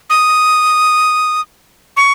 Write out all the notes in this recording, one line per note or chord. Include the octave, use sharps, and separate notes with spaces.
D#6
C#6